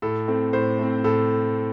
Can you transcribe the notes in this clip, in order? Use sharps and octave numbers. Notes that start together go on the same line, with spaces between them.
A2 A4
A3 C4
A2 C5
A3 C4
A2 A4